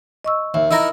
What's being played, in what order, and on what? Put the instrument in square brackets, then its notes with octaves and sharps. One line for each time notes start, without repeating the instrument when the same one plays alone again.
[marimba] D#5 C#6 E6
[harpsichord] D#2 [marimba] E5
[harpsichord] D#4 E4 A#4 [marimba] E6 A#6